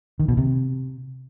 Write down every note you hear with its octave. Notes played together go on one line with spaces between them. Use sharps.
D#3
B2
C3